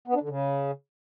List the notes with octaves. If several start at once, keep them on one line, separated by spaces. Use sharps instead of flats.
B3
D4
D3
C#3